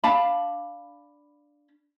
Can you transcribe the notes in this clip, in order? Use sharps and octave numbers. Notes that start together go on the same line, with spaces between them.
D4 F5 A5 B5